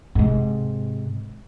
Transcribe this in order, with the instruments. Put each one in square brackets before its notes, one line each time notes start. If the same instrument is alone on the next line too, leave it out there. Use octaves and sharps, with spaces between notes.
[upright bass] G#2 C3